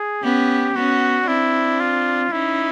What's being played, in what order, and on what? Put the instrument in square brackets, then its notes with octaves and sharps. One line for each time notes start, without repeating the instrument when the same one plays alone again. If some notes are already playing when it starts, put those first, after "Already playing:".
Already playing: [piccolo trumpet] G#4
[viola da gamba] B3 C#4 [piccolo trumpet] G4
[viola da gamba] B3 C#4 [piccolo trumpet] F#4
[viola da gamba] C4 D4 [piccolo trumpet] E4
[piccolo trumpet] F4
[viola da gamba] C#4 D#4 [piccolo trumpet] E4